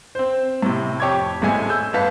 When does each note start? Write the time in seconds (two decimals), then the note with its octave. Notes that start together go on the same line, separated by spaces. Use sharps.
0.15 C4 C5
0.62 A2 C3
1.00 F2 G4 C#5 D6 G#6
1.41 G#1 A2 G#3 A3 G#5 G#6
1.69 E6 G6
1.93 G1 B3 F5 A5 B6